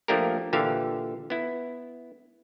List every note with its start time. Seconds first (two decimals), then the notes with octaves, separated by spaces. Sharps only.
0.08 F3 A3 A#3 D4 G4 A#4
0.53 A#2 D3 E3 G4 E5 F5
1.30 B3 E4